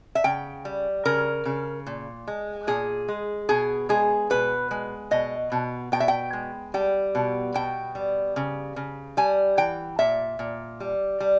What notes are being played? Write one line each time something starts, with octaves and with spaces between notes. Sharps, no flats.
E5
C#3 G5
G3
C#3 A#4
C#3
A#2
G#3
A#2 G#4
G#3
B2 G#4
G#3 G#4
B2 B4
G#3
B2 D#5
B2
B2 G5
E5
G5
G#3
G3 G5
B2
B2 G5
G3
C#3
C#3
G3 G#5
E3 G5
A#2 E5
A#2
G3
G3